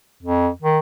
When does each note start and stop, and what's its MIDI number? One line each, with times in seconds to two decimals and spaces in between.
0.23 0.49 41
0.62 0.79 51